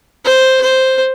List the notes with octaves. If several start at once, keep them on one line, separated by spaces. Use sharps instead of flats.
C5
C5